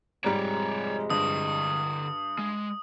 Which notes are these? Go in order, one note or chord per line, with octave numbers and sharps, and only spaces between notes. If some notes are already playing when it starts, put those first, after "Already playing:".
F2 G#2 C3 G3 G#3 C#5 D5
G2 D3 D#5 D#6
G#3